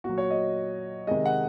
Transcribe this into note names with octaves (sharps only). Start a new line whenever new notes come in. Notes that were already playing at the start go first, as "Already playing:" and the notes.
A#2 F#3 F#4
C#5
D#5
C3 D#3 G#3 D#5
F#5